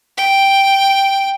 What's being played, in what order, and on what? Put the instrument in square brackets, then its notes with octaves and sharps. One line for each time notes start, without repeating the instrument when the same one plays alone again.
[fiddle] G5